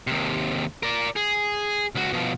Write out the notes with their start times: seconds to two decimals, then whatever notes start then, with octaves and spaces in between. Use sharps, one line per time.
0.07 D#2 C3
0.83 A#4 D5
1.16 G#4
1.95 C#2 F#4
2.13 B2 F3